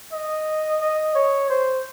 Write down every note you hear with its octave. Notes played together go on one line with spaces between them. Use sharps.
D#5
D#5
C#5
C5